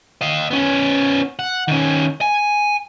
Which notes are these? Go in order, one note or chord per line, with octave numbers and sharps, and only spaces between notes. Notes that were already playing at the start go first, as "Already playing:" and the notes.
D#5 F5
B3 C#4
F#5
D#3 C#4
G#5